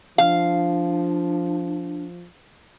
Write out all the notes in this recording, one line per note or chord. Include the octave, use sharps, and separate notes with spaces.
F3 D4 F5